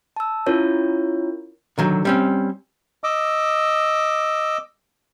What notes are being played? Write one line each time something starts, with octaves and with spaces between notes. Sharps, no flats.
A5 E6
C#4 E4 F4 A#4 C#5
D3 D#3 F#3
G3 C4 C#4
D#5 D6 E6